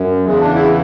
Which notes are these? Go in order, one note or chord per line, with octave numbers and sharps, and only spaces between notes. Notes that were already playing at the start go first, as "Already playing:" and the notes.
Already playing: F#2
E2 C#3 E3 G#3
D4
E4